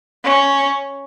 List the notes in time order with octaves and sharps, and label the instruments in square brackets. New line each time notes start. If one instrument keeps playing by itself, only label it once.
[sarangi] C#4